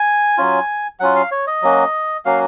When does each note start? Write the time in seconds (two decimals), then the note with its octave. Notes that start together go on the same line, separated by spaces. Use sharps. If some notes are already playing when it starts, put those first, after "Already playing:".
Already playing: G#5
0.38 F#3 C#4 F4
1.00 F#3 C#4 F4 F#5
1.16 F5
1.31 C#5
1.47 D#5
1.62 F#3 A#3 C#4 F#4
2.25 F#3 A#3 C#4 F#4 F5